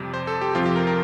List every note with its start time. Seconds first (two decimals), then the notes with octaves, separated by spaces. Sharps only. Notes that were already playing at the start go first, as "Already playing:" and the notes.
Already playing: F2 C3 G3
0.14 C5
0.27 A4
0.42 G4
0.55 F2 C3 F3 C4 F4
0.66 G4
0.76 A#4
0.87 A#4